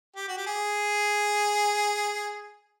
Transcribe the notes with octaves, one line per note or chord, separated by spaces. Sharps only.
G4
F#4
G4
G#4